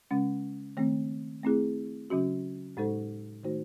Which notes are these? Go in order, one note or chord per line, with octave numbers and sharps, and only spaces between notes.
C#3 G#3 C#4
D#3 A3 C4
A3 C4 E4 G#4
C#3 F#3 C#4 F#4
A2 G#3 D#4 A4 C5
D#3 A3 D#4 F#4 C5